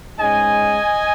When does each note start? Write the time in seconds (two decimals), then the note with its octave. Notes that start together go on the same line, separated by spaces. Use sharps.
0.18 G#2 G#3 C#4 D#5 G#5